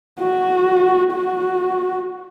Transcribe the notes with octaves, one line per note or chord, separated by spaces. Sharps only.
F#4
F#4